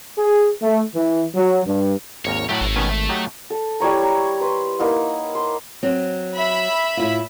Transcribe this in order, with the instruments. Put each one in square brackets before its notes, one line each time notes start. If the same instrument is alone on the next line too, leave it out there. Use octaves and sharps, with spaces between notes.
[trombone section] G#4
A3
E3
F#3
G2
[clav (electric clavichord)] G#1 D#2 A#4 [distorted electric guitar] C#5
[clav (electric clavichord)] A2 F#3 A3 [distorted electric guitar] G4 F#5
[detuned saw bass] G#1 [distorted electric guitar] A4 C#5
[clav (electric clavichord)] B2 D#3 C#4 [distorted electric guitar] A3
[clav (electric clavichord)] E5
F#3 D#4 G4
[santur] A4
G3 E4 C#5 A#5
A#5
B4 C6
A#3 D#4 E4 F#5
C6
[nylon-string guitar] F#3 C4
[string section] E5 B5
[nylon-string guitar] A2 E4 F4